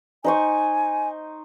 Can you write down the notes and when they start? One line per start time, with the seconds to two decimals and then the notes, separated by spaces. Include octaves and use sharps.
0.24 D#4 C5 G#5 C#6